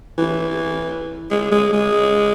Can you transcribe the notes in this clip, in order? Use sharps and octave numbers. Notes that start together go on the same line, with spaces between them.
E3
G#3
G#3
G#3